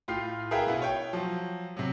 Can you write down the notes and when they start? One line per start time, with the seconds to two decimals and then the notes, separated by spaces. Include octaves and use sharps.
0.08 A2 F4 G5 F6 C7
0.51 G#4 A#4 B4 E5 F5 G5
0.67 B2 B3 E4
0.82 C#5 G5
1.13 F3 F#3
1.77 C3 F#3